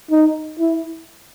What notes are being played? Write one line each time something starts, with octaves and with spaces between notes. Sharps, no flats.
D#4
E4